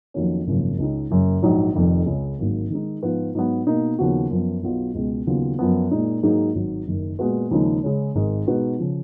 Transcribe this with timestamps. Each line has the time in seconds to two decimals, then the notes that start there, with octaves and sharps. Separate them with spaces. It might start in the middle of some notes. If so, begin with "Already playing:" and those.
0.14 F2 D#3 F#3 A#3 C#4
0.47 G#1 F#2 C#3 F3 A#3
0.78 C#2 C#3 G#3 D#4
1.10 F#1 F#2 C#3
1.42 A#1 G#2 F#3
1.74 F1 F2 D#3
2.06 C#2 C#3 G#3
2.39 G#1 G#2 F#3 A#3
2.70 D#3 G#3 D#4
3.03 G#2 F3 B3 F4 B4
3.35 G#2 F#3 B3
3.67 B2 A#3 D#4
3.99 D#2 C#3 F3 B3 F#4
4.30 F#2 F3 B3
4.63 B1 B2 F#3 B3 F4
4.95 C#2 B2 G#3
5.27 D#2 C#3 F#3 B3 F4
5.59 F#2 F3 B3
5.91 A#2 G#3 D#4
6.23 G#2 F#3 A#3 D#4 G#4
6.55 G#1 G#2 F#3
6.87 F#1 F#2 D#3
7.19 A#2 G#3 B3 F#4 B4
7.51 D#2 C#3 F3 G#3 D#4
7.83 C#3 G#3 C#4
8.15 G#1 G#2 D#3 G#3
8.47 B2 G#3 D#4 F#4 B4
8.79 C#3 F3